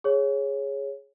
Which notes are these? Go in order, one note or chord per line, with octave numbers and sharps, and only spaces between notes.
G#4 C#5